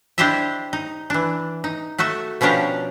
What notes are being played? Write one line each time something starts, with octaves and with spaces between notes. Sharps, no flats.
D4 E4 G4 C5 D#5 E5
D#4
E3 D4
D#4
A3 F#4 A4 E5
B2 F3 C#4 D4 G4 A#5